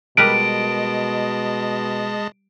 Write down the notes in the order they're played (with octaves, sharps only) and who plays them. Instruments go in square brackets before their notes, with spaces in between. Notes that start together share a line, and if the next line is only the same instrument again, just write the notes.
[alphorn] B2 [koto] G3 A#4 B4 [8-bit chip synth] G#3 D#5 A5 [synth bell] D7